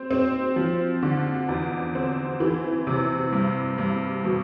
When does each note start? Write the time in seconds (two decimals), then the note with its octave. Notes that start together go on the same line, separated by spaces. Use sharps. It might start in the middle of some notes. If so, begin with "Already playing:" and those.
Already playing: C4
0.11 C4
0.56 F3
1.03 D3
1.49 E2
1.95 C4
2.40 E3
2.87 C3
3.32 G2
3.78 G2
4.24 B2